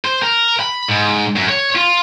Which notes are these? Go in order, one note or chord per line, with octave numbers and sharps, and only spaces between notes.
C5
A#4
B5
G#2
F#2
C#5
F4